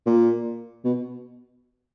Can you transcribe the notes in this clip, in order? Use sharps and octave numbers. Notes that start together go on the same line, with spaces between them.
A#2
B2